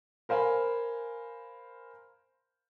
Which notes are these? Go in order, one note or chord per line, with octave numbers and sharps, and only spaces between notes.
A#4 C5 F5 G#5 B5